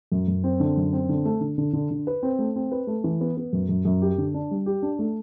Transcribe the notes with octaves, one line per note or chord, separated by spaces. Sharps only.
F#2
F#2
C4
D3
F#2
C4
D3
A3
D3
D3
D3
D3
B4
C4
A3
C4
B4
A3
E3
B3
B3
F#2
F#2
F#2
G4
D3
D4
G3
G4
D4
A3